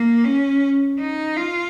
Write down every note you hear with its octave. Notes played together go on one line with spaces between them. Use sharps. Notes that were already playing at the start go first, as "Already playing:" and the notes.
Already playing: A#3
C#4
D#4
F4